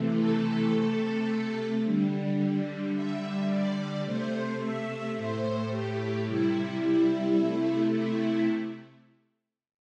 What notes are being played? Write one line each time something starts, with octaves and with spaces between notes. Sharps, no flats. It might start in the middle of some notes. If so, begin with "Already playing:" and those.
Already playing: C3 E3 A3
A4
C3 A3
D3 G3
D3 G3 E5
D5
C3 A3 C5
E5
A2 A3 C5
G4
C3 G3 E4
E4
C3 A3
E4